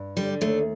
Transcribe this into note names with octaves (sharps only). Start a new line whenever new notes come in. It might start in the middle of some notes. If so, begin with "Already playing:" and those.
Already playing: G2
D3 G3
D#2 A3